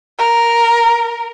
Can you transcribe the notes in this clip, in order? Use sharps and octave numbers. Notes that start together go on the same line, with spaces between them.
A#4